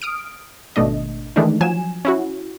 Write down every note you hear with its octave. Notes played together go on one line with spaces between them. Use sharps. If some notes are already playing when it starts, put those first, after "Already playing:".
D#6 F6 D7
G#1 B2 A3 D4 D#5
D#3 E3 G#3 A3 D4 D#4
F3 F#3 G#5 E7
C#4 E4 F#4